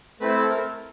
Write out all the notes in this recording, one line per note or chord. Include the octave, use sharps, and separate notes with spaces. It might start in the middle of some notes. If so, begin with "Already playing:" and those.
A3 C4 E4 B4
A4
A#4